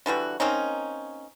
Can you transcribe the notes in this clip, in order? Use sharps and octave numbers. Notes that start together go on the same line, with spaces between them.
D3 E3 G3 F#4
A#3 C4 C#4 D#4